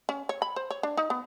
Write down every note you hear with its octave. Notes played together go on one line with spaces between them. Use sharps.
C#4
C#5
B5
C5
C#5
D4
D#4
B3